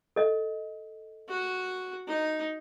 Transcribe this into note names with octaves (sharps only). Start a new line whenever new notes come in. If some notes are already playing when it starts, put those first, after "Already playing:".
A4 D#5
F#4
D#4